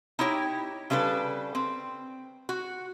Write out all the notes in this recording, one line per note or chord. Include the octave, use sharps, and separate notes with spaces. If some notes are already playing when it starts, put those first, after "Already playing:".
D#4 E4 G4 C#5 G5
C#3 G3 D4 A4 B4
C4
F#4